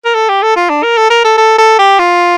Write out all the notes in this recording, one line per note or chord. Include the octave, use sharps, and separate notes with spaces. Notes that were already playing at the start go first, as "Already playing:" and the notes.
A#4
A4
G4
A4
F4
D4
A#4
A4
A#4
A4
A4
A4
G4
F4